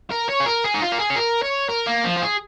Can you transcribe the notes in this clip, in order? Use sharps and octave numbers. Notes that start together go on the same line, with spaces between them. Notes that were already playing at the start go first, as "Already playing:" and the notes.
A#4
C#5
G#4
A#4
G#4
D#4
F4
A#4
G#4
C#5
A#4
C#5
A#4
A#3
F3
F4
G#4